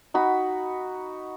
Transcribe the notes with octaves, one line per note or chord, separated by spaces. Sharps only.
D#4 F#4 B5